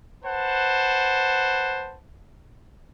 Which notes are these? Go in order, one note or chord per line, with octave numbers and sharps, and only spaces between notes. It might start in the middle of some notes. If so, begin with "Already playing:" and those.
B4 C5 F#5 A5